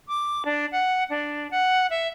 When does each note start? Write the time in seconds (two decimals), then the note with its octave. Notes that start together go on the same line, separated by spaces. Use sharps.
0.08 D6
0.45 D4
0.72 F#5
1.10 D4
1.51 F#5
1.90 E5